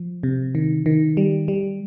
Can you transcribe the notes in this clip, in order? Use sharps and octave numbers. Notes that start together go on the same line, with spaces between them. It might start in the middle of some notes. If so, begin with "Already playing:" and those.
Already playing: F3
C3
D#3
D#3
G3
G3